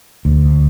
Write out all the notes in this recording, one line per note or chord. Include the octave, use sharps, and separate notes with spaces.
D2